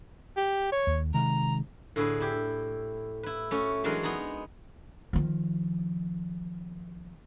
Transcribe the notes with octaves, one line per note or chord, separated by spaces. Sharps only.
G4
C#5
D#2
C3 D#3 G#3 A#5
A2 D3 G#4 B4
E4 G4
E4 B4
A3 C#4 F#4
E3 F#3 G#3 D4 A#4 B4
B3 D#4 G#4 A#5
D#3 F3